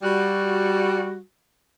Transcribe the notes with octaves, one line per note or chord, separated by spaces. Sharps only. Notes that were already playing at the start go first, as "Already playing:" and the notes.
G3 F#4